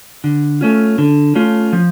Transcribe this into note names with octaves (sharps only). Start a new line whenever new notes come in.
D3
A3 C#4 F4
D3
A3 C#4 F4
F3